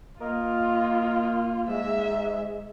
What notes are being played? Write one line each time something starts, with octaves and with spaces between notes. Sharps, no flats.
A#3 F4 A#4 D#5
G#2 G#3 E5